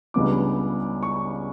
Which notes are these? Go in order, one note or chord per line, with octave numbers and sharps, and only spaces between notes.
C#2 C#3 G3 B3 D4 D6
C#6